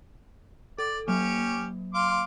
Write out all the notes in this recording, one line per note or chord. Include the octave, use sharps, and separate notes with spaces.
A4 D5
F#3 A#3 C#4 G4
F5 C6 D6